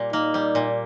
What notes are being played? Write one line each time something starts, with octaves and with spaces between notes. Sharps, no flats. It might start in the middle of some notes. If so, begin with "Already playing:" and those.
Already playing: A#2 G3
A#3 D#4
G3
A#2